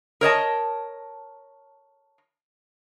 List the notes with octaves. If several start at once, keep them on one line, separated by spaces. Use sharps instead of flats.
A#4 C#5 D#5 A5